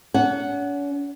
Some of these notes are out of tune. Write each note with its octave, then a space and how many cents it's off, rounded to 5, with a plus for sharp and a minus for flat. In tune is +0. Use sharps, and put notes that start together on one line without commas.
C#4 +45 F#5 +0